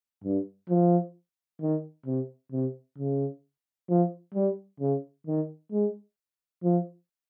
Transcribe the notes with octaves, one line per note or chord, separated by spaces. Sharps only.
G2
F3
D#3
C3
C3
C#3
F3
G3
C#3
D#3
G#3
F3